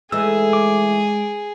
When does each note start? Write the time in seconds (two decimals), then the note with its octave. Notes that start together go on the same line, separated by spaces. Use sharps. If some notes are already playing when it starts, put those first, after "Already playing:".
0.12 E3 G#3 A3 D#4 G#4 E6
0.53 D6